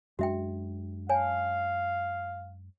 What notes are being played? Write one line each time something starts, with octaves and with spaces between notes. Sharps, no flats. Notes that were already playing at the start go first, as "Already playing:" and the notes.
F#2 G#3 D4 F#4 E5 G5
C#5 F5 G#5 A5